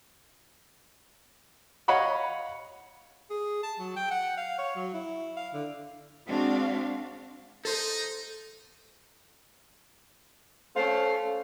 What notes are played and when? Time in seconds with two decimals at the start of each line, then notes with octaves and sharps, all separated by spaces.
1.88 C#5 D#5 F5 F#5 B5 C#6
3.30 G#4
3.63 A5
3.79 F#3
3.96 G5
4.11 F#5
4.38 F5
4.58 C#5
4.76 F#3
4.94 E4
5.36 F5
5.53 D3
6.27 G#3 C4 D4 F#4 F5
7.65 D#4 A4 C5
10.77 A3 C#4 C5 F5